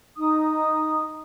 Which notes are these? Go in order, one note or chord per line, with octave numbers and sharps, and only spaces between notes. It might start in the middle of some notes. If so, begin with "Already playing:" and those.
D#4 D#6